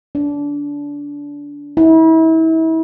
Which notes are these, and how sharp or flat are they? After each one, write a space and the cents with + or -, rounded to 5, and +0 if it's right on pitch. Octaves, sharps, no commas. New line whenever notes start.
D4 -25
E4 -35